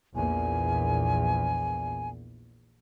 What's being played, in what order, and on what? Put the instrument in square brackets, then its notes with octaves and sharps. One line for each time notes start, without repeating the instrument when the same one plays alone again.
[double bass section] A#1 E2 A#2 [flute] G#5